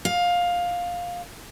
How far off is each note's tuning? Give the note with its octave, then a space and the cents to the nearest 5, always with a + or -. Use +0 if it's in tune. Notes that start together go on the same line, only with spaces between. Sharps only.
F5 +15